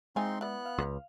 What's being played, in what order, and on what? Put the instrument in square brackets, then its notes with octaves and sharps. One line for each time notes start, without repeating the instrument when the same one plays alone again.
[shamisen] E3 F4 G#5 [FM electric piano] G#3 [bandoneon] C4 D#4 C6
[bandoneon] B3 F#6 [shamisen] E4 D5
[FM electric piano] F5
[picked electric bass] C#2